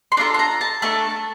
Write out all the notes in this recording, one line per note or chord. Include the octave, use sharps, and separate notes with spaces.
C6
D4 F4 A4 A#5
C6
A#5
A5
A3 D4 A4 A5